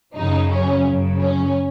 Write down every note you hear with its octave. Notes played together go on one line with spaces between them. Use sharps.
F#2 C#3 F#3 D#4
C#4
F#2 C#3 F#3
C#4